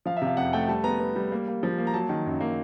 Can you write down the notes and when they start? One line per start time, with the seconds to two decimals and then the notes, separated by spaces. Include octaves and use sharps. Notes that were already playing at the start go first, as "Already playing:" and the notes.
0.06 F3 F5
0.17 E5
0.22 C3
0.27 F5
0.37 F2 F#5
0.53 A3 G5
0.68 G3 A5
0.84 B3 A#5
1.00 B3
1.16 G3
1.32 A#3
1.48 A#3
1.63 F3
1.78 A#3
1.87 A#5
1.94 F#3 A5
2.09 D#3
2.26 F#2
2.40 A#3